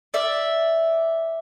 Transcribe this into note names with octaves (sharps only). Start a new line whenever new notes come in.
D5 E5